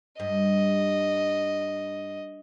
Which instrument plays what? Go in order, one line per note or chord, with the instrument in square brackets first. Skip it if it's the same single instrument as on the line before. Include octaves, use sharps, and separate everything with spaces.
[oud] G2 [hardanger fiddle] D#5